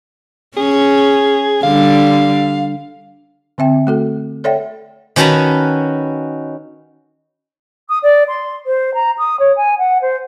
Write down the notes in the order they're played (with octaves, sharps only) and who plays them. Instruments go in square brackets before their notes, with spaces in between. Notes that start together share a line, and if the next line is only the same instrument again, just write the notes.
[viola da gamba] C#4 [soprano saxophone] G#4
[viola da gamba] D3 G3 [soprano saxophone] F5
[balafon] D3 C4 E5 G5
A3 F#4 A4
A4 C#5 D5 E5 F#5 G5
[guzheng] D#3 C#4 F#4 B4 A5 A#5
[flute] D#6
D5
C6
C5
A#5
D#6
C#5
G#5
F#5
C5